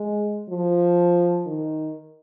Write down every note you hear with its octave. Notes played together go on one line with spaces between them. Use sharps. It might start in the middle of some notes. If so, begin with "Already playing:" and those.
Already playing: G#3
F3
D#3